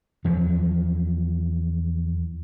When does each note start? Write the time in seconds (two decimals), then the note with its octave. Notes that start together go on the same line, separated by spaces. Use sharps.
0.24 E2 F3 F#3